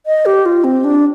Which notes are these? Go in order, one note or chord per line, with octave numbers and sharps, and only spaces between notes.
D#5
G4
F4
C4
D4